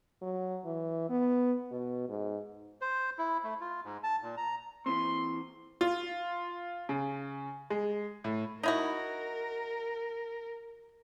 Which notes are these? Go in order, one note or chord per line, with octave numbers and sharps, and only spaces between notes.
F#3
E3
B3
B2
G#2
C5
E4
A3
F4
G#2
A5
A#2
A#5
E3 C4 C6
F4
C#3
G#3
A2
D#4 E4 F#4 A#4